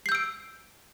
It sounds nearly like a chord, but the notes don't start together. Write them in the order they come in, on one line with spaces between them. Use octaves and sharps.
C7 G6 E6 D7